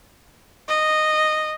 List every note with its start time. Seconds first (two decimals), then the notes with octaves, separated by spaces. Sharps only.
0.68 D#5